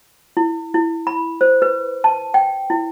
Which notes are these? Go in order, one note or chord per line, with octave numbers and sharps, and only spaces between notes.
E4
E4
B5
C5
B4
A5
G5
E4